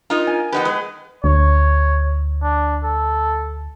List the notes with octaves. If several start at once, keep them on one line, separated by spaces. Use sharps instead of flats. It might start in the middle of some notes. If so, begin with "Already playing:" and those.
D#4 F4 A#4
G#5
F2 D#4 G4 B4 F#5
G#3 B4
D2 C#5
D4
A4